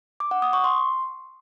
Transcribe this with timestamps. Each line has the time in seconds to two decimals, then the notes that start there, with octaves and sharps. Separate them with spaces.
0.20 D6
0.31 F#5
0.42 D#6
0.53 C#6
0.64 C6